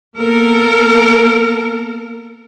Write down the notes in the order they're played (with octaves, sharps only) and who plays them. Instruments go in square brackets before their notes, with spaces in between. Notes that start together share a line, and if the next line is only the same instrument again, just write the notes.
[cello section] A#3 B3 A4 A#4